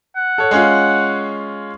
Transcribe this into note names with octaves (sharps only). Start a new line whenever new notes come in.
F#5
A4 C#5
G#3 C#4 F4